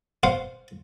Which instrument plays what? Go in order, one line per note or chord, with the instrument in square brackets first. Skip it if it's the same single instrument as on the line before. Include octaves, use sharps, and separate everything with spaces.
[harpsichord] C5 F5 F#5